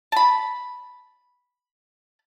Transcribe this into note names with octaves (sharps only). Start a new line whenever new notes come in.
A5 B5